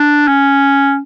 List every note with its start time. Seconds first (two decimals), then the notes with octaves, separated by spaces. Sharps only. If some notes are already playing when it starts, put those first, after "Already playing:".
Already playing: D4
0.28 C#4